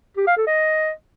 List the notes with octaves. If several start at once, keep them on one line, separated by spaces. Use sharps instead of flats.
G4
F5
A4
D#5